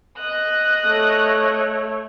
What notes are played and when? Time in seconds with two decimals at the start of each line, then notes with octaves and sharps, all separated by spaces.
0.19 D#5 F#6
0.86 A3 C#5